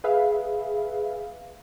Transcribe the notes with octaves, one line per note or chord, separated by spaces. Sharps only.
G#4 B4 E5 F5